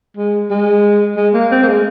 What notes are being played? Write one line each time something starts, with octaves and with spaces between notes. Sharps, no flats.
G#3
G#3
G#3
A#3
C4
A#3
G#3